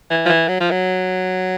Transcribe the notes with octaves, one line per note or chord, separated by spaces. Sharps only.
E3
F3
E3
F#3
F3
F#3